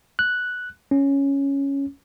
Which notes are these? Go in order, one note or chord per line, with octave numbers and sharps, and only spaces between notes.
F#6
C#4